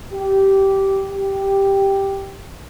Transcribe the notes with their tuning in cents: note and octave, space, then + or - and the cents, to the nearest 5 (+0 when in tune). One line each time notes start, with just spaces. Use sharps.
G4 -15
G4 +0